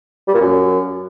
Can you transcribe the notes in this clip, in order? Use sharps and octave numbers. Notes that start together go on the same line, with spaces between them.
G3
A#2
F#2